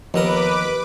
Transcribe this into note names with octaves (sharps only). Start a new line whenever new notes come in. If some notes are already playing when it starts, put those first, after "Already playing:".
D#2 F3 B3 A#4 B4 D#5 D6